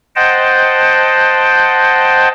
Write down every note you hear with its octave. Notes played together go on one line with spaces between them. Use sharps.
C5 D#5 F#5 G5 A5